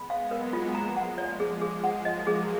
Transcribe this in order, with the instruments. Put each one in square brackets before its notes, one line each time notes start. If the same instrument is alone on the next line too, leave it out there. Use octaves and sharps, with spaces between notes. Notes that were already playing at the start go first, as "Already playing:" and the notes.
Already playing: [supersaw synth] G#3 B3 [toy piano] B5
[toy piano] F5
[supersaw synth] F#3 A#3 [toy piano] A#4
[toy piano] F4
[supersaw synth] F3 G#3 [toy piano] A#5
[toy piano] F#5
[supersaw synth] F3 G#3 [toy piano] D5
[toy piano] G#4
[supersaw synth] F3 G#3 [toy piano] G#4
[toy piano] F#5
[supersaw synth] F#3 A#3 [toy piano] D#5
[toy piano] G#4